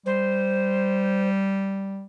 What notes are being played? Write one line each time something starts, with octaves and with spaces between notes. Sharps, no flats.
G3 C5